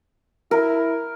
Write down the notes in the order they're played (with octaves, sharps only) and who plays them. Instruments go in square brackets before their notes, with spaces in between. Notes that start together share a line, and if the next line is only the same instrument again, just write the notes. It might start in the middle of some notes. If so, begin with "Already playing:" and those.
[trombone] E4 [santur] A#4